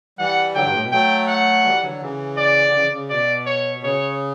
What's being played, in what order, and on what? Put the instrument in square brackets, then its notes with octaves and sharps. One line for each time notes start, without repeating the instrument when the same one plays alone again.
[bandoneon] E3 G3 [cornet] F#5
[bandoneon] D3 F#3 [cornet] G5
[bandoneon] G2
A2
B2
[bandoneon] F#3 A3 [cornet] G5
[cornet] F#5
[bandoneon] E3 G3
D3 F#3
C#3 E3
[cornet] D5
[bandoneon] D3
C#3
C#3
[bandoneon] B2 [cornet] D5
[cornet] C#5
[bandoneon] C#3 [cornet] C#5